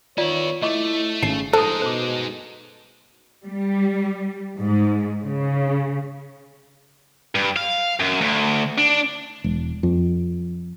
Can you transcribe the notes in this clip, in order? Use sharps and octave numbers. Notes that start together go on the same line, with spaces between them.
D#3 B3 E4 F4 C#5 D5
A3 E4 D#5 C#6 D6
G#1 C#3 D#4 C7
A#1 A2 G#3 D#4 A4 C5 D#6
B2 C5 D6
G3
G#2
C#3
G2
F5
F#2
D2
D4
E1
F2